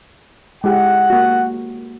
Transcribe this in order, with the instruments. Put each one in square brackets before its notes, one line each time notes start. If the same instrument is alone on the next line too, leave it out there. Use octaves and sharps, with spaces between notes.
[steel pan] G#3 E4 G4 [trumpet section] F#5
[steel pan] A#3 F#4